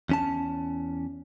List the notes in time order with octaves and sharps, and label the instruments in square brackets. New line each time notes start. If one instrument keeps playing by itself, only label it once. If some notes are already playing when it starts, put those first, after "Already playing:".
[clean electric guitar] E2 C#4 A5